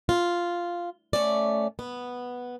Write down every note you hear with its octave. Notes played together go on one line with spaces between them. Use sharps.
F4
A3 C#4 D5
B3